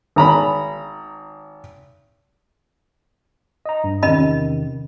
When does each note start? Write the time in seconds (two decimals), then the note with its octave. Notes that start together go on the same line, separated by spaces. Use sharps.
0.16 G#1 A#5 B5
3.66 D#5 A#5
3.84 G2
4.03 E2 C3 D#3 C#4 D#5 B5